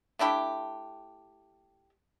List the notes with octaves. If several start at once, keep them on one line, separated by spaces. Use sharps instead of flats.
A3 D4 E4 G4